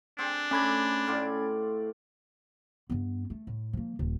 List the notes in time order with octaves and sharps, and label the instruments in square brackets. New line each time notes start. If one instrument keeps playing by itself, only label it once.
[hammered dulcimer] C4 G#4 [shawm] D4
[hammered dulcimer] A3 [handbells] C#4 B5 G#6
[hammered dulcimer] A2 F4 D5
[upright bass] G2 B3
A3
A2
F3 A#3
D#1 D#3